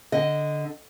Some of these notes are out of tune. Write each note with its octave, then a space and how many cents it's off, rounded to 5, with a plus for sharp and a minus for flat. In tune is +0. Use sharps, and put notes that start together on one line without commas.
D3 +0 D#5 +0